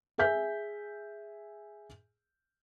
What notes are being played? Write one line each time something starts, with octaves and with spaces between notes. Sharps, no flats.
G#4 E5 G#5 G6 B6